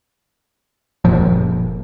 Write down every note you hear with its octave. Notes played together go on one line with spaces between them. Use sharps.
F#1 A#2 F3